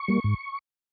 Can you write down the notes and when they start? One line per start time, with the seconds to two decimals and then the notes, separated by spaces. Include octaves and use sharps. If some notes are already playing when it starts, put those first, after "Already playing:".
Already playing: C#6
0.08 G3 A#3
0.24 G#2